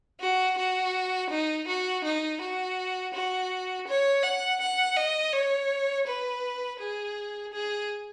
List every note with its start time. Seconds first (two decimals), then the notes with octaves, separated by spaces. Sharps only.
0.20 F#4
0.57 F#4
1.30 D#4
1.67 F#4
2.04 D#4
2.41 F#4
3.14 F#4
3.87 C#5
4.23 F#5
4.61 F#5
4.97 D#5
5.33 C#5
6.07 B4
6.80 G#4
7.53 G#4